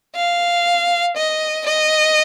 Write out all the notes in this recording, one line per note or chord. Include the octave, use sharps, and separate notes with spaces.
F5
D#5
D#5